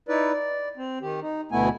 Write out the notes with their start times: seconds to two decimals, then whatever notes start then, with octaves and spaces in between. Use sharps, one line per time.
0.09 D#4 E4 B4 D5
0.33 D5
0.77 C4
1.02 D#3 G4
1.22 D#4
1.52 D2 B2 A3 B3 E4 G#5